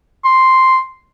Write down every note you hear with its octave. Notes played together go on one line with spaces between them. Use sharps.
C6